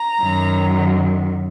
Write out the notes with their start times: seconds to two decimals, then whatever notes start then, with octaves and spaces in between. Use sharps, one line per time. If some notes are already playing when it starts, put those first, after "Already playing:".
Already playing: A#5
0.20 F#2 D#3 F#3